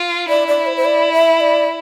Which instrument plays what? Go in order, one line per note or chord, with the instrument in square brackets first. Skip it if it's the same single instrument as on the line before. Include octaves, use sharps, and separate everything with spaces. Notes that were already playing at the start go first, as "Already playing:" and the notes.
Already playing: [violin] F4
[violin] E4 [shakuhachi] D5
[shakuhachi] D5
C5
C5
D5
E5
D5